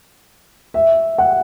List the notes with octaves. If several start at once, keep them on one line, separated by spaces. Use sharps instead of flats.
E5
F#5